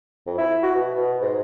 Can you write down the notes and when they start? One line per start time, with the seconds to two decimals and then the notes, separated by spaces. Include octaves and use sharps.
0.26 F2
0.38 E4
0.63 F#4
0.75 B2
0.96 B2
1.21 G#2